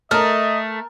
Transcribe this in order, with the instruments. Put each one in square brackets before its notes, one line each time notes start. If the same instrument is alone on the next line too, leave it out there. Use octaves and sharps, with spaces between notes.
[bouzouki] A3 [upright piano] A#4 F6 [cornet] D#5